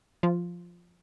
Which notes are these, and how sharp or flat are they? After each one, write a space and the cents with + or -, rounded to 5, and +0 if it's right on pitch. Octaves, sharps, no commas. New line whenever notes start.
F3 +0 F4 +0